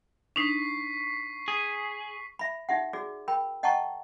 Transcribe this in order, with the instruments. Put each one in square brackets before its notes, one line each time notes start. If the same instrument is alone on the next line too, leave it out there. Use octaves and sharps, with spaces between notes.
[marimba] D4 D#4 [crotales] C#6 B6 C7
[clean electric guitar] G#4
[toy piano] E5 B5
D#4 G4 E5 F#5
F#4 G#4 D5
A#4 G5 B5
D#5 F#5 G5 A5 A#5 C#6